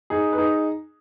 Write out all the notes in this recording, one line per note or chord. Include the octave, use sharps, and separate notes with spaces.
D#4 G#4
B4
D#4 G#4